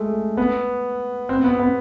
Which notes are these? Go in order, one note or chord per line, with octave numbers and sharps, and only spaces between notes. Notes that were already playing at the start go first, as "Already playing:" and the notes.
Already playing: G#3 A3
B3
C4
B3
B3